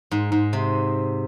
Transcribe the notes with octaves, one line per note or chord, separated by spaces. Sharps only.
G#2
G#2
C3